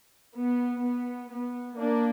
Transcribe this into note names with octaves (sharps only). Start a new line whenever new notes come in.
B3
B3
B3
A#3 D4